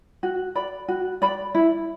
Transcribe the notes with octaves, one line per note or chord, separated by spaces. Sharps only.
F#4
D5 B5
F#4
D5 B5
E4